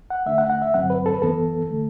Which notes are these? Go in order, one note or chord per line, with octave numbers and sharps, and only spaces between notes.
F#5
D3 A3 D4 E5
F#5
F#5
E5
G2 D3 F#3 C4 F#5
B4
A4
B4
F#2 E3 B3 A4
D3 A3